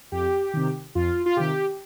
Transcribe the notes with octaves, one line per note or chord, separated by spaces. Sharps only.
F2 G4
C3 D#3
F2 F4
F4
C3 D#3 G4